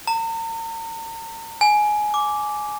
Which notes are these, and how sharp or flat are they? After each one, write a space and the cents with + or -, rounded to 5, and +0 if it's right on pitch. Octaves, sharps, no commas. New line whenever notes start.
A#5 -45
G#5 +15
D6 -10